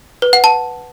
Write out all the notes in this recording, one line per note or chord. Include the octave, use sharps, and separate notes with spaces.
B4
F#5
A5